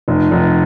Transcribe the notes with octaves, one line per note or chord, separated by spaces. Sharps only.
F1
F1